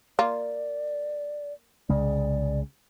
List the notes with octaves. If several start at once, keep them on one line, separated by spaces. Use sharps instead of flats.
A#3 F4 D5
C2 C#3 G#3 D5